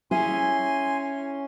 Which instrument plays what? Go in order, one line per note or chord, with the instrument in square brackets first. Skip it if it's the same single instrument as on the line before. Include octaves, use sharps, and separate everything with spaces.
[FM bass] C#4 [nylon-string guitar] E4 G#4 [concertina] G#5 C6